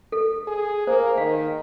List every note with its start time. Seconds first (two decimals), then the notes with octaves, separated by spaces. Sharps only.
0.12 A4
0.47 G#4
0.87 A#3 C5
1.17 D#3 F5